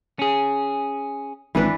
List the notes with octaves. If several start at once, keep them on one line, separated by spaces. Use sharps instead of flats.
C#4 G#4
G#1 E3 D4 B4